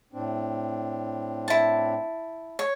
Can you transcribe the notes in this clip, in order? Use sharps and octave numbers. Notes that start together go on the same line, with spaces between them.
A2 C4 D4
E4 A5
C#5